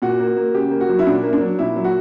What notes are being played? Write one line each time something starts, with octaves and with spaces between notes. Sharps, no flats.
A#2 F#4
A#3
A#3
C#3 G4
A#3
F#4
F#3
E4
A#2 D4
A#3
D4
F#3
A#2 E4
F#3
F#4